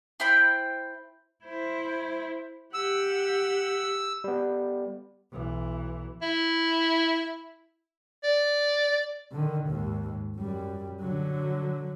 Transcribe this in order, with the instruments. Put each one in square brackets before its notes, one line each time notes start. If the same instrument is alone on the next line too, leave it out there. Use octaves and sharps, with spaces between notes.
[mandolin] E4 C5 G5 B5
[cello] E4 C5
[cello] G4 F#5 [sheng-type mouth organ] E6
[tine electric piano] G3 B3
[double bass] B1 E3
[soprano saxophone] E4
D5
[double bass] D3 D#3
D#2 G#2
F#2 G3
D3 F#3